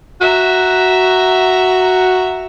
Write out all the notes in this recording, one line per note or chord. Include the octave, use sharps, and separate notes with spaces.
F#4 E5 A#5